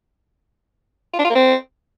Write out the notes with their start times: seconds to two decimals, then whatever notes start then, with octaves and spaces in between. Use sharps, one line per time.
1.14 F4
1.19 D4
1.25 F4
1.30 A#3
1.36 C4